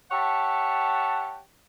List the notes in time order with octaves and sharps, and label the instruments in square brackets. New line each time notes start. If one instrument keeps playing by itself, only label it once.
[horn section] G4 C#5 E5 F#5 A5